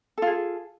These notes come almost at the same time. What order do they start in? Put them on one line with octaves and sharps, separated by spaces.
A4 F4 G#4